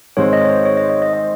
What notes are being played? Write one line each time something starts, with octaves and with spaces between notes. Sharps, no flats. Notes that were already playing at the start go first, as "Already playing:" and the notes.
G#2 D#3 G#3 C4 C#5
D#5
C#5
C5
C#5
D#5
D#5
D#5
D#5